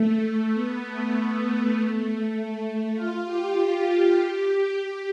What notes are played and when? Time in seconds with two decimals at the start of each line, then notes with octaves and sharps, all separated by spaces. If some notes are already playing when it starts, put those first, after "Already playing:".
Already playing: A3
0.54 B3
0.84 A3
1.75 A3
2.94 F4
3.25 G4
4.76 G4